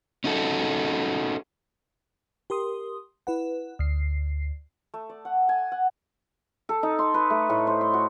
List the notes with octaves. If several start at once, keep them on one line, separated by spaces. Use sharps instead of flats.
C#4 D#4 F#4 A4
G4 A#4 C6 D#6
E4 B4 F#5
D2 C7
A3
D5
F#5
G#5
F#5
A4
D#4
C6
B4
A3
A2
C5
C6
F#4